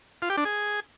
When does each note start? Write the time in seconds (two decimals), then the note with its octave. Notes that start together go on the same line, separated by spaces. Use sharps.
0.22 F4
0.30 G4
0.37 D4
0.45 G#4